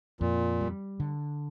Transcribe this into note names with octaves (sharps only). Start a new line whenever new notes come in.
F2 A#2
G3
D3